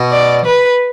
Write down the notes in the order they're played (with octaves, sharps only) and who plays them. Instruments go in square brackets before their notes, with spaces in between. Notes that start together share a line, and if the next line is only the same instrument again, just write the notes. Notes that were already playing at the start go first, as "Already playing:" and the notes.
Already playing: [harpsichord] B2
[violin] D5
B4